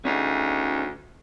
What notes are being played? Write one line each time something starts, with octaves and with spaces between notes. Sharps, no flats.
D2 C#4 D#4 G#4